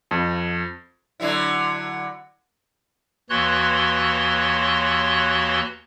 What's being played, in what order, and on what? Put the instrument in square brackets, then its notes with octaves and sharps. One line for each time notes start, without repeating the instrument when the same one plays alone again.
[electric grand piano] F2
[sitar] D3 F#3 E4
[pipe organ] D#2 E3 F#4 C#5 C6 F#6